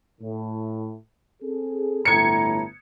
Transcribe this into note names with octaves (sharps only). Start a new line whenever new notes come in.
A2
C4 G#4 A4
G1 A2 A#5 G#6 C#7